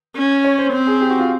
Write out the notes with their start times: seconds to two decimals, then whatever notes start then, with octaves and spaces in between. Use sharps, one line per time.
0.16 C#4
0.44 C#5
0.59 C5
0.73 C4
0.87 G#4
1.01 G4
1.10 F#4
1.19 F4